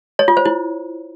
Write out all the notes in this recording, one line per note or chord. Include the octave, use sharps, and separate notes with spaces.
C#5
F4
C5
E4